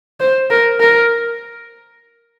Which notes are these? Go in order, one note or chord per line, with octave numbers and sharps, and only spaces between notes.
C5
A#4
A#4